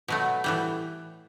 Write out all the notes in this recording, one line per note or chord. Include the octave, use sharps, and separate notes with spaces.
B2 F#3 A3
A2 E3 G3